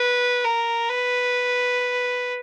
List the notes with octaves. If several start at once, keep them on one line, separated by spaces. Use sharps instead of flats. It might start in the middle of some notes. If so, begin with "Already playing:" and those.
Already playing: B4
A#4
B4